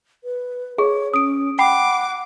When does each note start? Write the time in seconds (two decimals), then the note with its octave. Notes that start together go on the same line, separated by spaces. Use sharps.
0.24 B4
0.78 G#4 C#5 C#6
1.14 C#4 D#6 D7
1.59 F#5 G5 B5 D6 C7